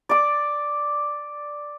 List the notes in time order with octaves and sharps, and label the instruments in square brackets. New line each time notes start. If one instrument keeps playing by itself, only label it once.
[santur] D5 D6